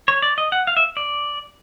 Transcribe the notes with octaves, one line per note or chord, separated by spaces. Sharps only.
C#5
D5
D#5
F#5
F5
E5
D5